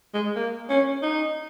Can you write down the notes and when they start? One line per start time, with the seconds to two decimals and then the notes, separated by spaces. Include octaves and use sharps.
0.14 G#3
0.36 A#3
0.69 C#4
1.02 D#4